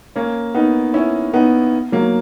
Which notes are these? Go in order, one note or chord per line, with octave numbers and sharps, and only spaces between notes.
A#3 C#4
B3 D#4
C#4 E4
B3 D#4
F#3 A#3